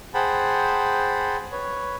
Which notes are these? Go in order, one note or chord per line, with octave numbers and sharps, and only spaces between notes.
G#4 C5 F#5 G5 A5 B5
B4 C#5